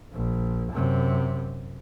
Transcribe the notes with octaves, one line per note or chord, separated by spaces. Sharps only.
A#1
F#2 C3